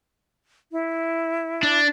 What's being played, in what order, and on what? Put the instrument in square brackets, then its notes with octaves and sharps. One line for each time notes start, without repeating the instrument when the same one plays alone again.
[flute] E4
[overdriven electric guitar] D4